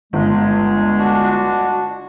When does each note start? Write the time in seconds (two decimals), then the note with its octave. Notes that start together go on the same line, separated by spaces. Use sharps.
0.13 G1 G#3
0.99 D4 F#4